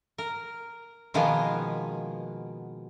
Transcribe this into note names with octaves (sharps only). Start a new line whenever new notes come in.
A#4
B2 D#3 F3 G#3 A#3 B3